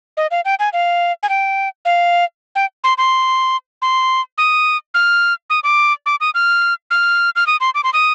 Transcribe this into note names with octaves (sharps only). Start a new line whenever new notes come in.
D#5
F5
G5
G#5
F5
G#5
G5
F5
G5
C6
C6
C6
D#6
F6
D#6
D6
D6
D#6
F6
F6
F6
D#6
C6
D6
C6
D#6